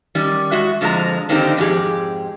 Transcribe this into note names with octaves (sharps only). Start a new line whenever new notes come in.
D#3 G3 C#4
G#3 F#4 E5
F2 D3 F3 G#3 F#4 A#5
D3 D#3 A#3 C4 D#4 G4
F2 G#2 G#3 G4 G#4